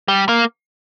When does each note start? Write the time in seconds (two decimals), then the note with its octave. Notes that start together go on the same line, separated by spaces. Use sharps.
0.08 G3
0.29 A#3